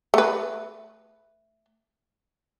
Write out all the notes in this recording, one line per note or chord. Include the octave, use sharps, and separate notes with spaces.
A3 B4